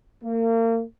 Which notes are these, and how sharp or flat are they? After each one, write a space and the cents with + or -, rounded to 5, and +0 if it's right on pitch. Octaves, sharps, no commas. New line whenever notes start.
A#3 -35